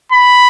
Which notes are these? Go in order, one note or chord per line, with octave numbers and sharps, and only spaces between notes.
B5